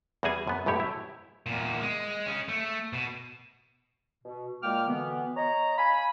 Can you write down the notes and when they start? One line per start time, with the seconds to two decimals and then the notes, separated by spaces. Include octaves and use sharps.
0.23 E2 G3 F#4 G#4 G#5
0.47 F#2 B3
0.66 B1 F#2 A2 G4 C#5
0.80 E4
1.46 E2 A#2
1.81 G#3
2.26 C#4 G#4
2.48 A3
2.93 B2
4.24 B2
4.63 A#2 G#3 A#3 G5 D6 F6
4.87 B2 D3 E3 B3
5.37 C#5 D#5 A#5
5.78 F5 G#5 B5